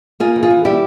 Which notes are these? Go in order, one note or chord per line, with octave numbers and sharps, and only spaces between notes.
A#3 F4 G#4
E3
F4 G#4
E3
G3 E4 G4